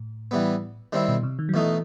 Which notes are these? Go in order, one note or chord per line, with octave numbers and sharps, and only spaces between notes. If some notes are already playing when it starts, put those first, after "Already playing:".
Already playing: A2
E3 G3 B3
D#3 G3 C4 E4
B2
C3
D#3
F#3
B2 E3 A3 D#4